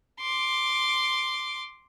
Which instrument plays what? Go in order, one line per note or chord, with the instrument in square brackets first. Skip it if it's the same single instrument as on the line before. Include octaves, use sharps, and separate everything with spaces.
[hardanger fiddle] C6 D6